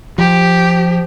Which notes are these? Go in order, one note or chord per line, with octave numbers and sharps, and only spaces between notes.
F3 G4